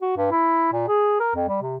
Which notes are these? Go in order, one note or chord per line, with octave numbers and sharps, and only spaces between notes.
F#4
G2
E4
A#2
G#4
A#4
F2
G3
C3